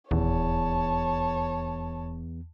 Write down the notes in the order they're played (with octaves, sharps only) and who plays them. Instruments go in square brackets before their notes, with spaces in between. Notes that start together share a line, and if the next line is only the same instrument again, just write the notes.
[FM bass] D#1 [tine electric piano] E2 [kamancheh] C#5 A5